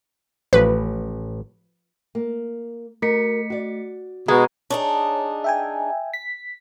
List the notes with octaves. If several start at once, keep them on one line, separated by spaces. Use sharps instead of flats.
A1 F3 B4
A#3
A3 F#4 A#4 B6 C#7
F#4 D5
B2 G#3 A#5
D4 D#4 G#4 C#5
E5 G5 G#5
B6